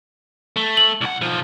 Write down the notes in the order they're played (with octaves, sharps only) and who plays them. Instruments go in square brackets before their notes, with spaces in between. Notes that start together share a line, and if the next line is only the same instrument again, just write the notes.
[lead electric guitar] A3
[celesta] F#7
[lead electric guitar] C2 F#5
B1 F3